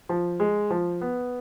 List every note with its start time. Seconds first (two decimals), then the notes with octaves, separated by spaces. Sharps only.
0.09 F3
0.40 G#3
0.70 F3
1.01 B3